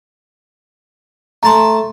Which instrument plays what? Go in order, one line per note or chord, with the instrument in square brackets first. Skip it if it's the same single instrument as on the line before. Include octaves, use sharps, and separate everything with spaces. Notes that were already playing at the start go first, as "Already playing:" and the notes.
[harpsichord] A3 A5 [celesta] A#5 C6